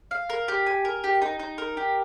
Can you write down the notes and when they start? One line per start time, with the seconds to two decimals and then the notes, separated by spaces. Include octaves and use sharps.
0.11 F5
0.30 A#4
0.48 G4
0.66 G#5
0.85 A#4
1.04 G4
1.22 D#4
1.39 D#4
1.58 A#4
1.77 G4